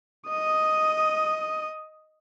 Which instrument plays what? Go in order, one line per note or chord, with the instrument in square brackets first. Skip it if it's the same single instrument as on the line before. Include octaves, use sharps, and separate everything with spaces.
[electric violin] D#5 D#6